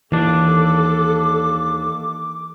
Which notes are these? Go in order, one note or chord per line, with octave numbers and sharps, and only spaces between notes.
D#2 E3 D4 A4 D6